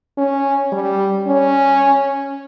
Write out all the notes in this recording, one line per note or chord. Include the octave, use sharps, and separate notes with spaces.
C#4
G3
C#4